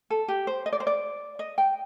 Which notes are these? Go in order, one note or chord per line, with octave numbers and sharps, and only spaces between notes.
A4
G4
C5
D#5
D5
C5
D5
D#5
G5